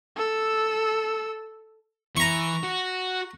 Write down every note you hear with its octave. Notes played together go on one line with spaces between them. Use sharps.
A4 E6
E3 A#5 C#6
F#4